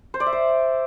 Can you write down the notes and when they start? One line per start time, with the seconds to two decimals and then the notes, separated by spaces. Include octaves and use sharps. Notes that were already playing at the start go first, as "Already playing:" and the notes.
0.14 C5
0.20 D5
0.26 E5
0.33 C5